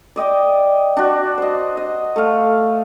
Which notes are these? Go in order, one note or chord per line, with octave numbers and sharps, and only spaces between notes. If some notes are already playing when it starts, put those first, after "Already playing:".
D5 D#5 G5 D6
D4 F#4
C5 D#5
D#5
A3 F5